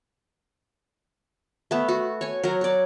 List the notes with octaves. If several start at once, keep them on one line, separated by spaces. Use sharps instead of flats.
A3 B3
F#4
C#5 G#5
F#3 A#4
C#5 D5